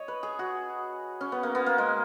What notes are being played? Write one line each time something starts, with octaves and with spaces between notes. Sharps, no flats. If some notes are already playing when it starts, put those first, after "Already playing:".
Already playing: C#5 D#5
B4
G#4
F#4
C#4
B3
A#3
B3
A#3
G#3